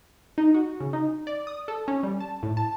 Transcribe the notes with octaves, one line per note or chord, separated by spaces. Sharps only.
D#4
F#4
C#3
D#4
D5
D#6
A4
C#4
G3
A5
A2
A5